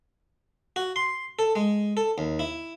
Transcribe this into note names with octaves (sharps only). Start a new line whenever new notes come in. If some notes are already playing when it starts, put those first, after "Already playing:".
F#4
C6
A4
G#3
A4
D#2
E4